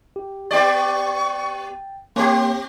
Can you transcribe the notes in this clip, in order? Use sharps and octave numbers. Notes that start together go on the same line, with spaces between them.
G4
B3 G4 D5 G5 C#6 A6
A#3 C4 G4 C#5 G5 C6